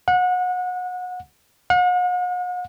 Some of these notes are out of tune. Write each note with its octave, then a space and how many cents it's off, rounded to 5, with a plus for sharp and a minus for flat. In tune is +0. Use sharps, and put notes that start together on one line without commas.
F#5 -30
F#5 -45